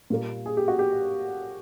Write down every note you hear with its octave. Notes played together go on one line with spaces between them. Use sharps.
A#2 G3 A#3
G#4
G4
F#4
G4